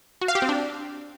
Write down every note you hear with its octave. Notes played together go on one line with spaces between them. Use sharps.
F#4
F5
G4
C4
D4